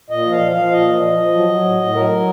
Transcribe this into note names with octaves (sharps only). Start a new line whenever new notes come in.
A#2 D#5
F3
F5
F3
F3 F5
A#2 D#5
F3
F3
F3
F#3
F#3
A2
A2
F#3 A#4
F#3